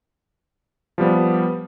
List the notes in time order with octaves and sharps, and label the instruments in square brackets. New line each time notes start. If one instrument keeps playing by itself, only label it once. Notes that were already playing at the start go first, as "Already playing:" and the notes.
[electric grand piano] F3 G3 B3